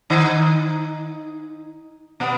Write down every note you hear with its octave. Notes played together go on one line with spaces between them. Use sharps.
D#3 D#4
B2 B3